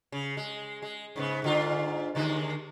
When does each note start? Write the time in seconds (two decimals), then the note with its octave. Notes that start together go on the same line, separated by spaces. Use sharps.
0.12 C#3
0.37 G#3
0.82 G#3
1.16 G#2 C#3 B3
1.42 G#2 D3 F4
2.15 D#2 D3 G#3